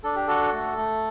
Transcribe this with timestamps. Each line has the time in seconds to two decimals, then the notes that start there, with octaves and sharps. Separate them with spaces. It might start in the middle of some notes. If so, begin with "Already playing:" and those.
0.04 D4 A4
0.16 G4
0.27 F#4 A4
0.53 A3
0.77 A3